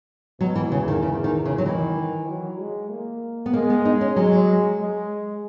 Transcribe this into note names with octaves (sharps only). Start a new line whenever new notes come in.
B2 F#3
E3
E2 C#3
D#3
E2 C#3
D#3
C#3
F#3
D#3 E3
D#3
F#3
G#3
A#3
B3
G#3 A#3
B3
D#4
C#4
F#3 G#3
G#3